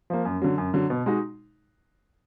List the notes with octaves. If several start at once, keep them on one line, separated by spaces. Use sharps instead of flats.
F3 A#3
F#2
D3 F#3
F#2
D3 F#3
B2
G#3 D#4 F#4